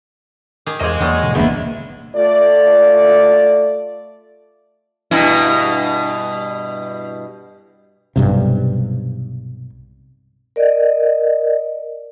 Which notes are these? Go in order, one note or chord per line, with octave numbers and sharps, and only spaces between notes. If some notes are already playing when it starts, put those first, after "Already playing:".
D#3 G4 G#4
E2 A#3 C4 G#4 D#5
E2 D#3 F#3 G3 A#3
G#2 B2 D3
D2 G2 D3 E3 A#3 B3 E4
A3 F4 D5
G2 B2 E4
B1 G2 C3
A#4 D5 D#5